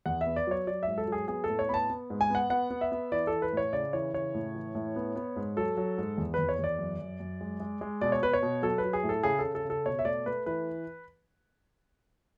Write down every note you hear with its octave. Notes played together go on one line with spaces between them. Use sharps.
E2 F#5
E5
B3
D5
F#3 C#5
F#3 D5
G#2 E5
A4
F#3 G#4
B3 G#4
A4
A2
C#5
B3 A5 B5
B3
G#2
G#5
B3 F#5
B3 F#5
B3
E5
B3
E3 D5
E3 A4
B4
A2 C#5
C#3 D5
E3 C#5
C#3 C#5
A2
E3
A2
B3
B3
G#2
F#3 A4
F#3
G#2
E2
E2 B4
C#5
E2
D5
F#2
F#2
F#2
G#3
G#3
G#3
B2 D5
C#5
B2 B4
C#5
B2
F#3 A4
B4
F#3
G#4
A2
A4
C#3 G#4
A4
C#3
A4
C#3
A4
B2 C#5
E5
A3 D5
A3 B4
E3 B4